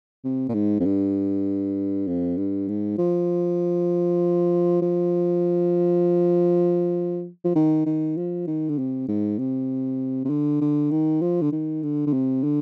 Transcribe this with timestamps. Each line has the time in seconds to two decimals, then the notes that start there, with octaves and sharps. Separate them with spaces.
0.24 C3
0.49 A#2
0.54 G#2
0.80 F2
0.85 G2
2.07 F2
2.37 G2
2.68 G#2
2.98 F3
4.82 F3
7.44 F3
7.55 D#3
7.86 D#3
8.17 F3
8.47 D#3
8.69 D3
8.78 C3
9.08 G#2
9.39 C3
10.25 C3
10.30 D3
10.61 D3
10.91 D#3
11.21 F3
11.42 D3
11.52 D#3
11.83 D3
12.07 D3
12.13 C3
12.44 D3